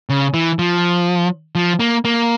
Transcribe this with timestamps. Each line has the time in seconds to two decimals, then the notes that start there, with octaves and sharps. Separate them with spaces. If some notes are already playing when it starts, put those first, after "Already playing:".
0.10 C#3
0.34 E3
0.59 F3
1.55 F3
1.80 A#3
2.05 A#3